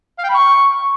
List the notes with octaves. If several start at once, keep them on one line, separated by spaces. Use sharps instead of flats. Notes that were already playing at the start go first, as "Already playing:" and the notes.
F5
G5
B5
C#6